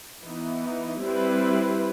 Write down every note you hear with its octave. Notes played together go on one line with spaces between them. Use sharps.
E3 B3 D#4
G3 C4 E4 B4